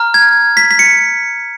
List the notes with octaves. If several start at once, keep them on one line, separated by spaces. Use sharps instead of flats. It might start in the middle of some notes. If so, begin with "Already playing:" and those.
Already playing: A#5 F6
G#6
B6
B6
C#7